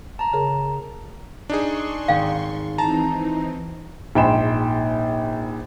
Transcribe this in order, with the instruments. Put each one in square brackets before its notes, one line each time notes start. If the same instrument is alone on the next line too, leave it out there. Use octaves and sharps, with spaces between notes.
[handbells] A5 A#5
[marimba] C#3 G#4 A#4
[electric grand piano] D4 D#4 G#4 [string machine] C6 C#6
[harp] G#1 [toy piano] F5 G5
[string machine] E3 C4 D#4 [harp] A5 [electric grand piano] A#5
[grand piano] A#1 G#2 G5 B5 C6 E7